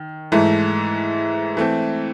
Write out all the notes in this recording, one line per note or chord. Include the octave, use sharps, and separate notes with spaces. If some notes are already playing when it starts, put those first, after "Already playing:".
Already playing: D#3
G#2 E3 A3
E3 A3 C4